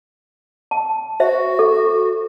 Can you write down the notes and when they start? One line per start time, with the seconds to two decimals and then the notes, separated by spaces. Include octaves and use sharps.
0.71 A5
1.20 F#4 C5 E5
1.59 A4